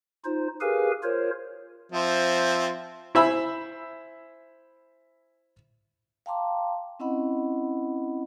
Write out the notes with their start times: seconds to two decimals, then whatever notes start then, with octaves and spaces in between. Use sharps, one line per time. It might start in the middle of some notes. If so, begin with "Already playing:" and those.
0.25 D#4 F4 C5
0.61 G4 G#4 A#4 B4 F5 G#5
1.03 F4 A#4 C5 C#5
1.92 F3 C4 E5
3.15 E4 C5 E5 G#5 B5 E6
6.26 F5 G5 A5 A#5 C6 D6
7.00 C4 C#4 E4 D#5 F#5 B5